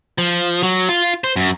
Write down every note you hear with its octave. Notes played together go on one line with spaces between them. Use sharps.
F3
F#3
F4
C5
F#2